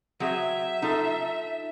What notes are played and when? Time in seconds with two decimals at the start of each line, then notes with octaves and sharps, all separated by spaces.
0.20 F#3 C4 G#4 E5
0.82 D#4 F4 A4